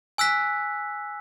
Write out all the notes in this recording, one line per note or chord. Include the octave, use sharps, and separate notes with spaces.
G#5 E6 F#6 B6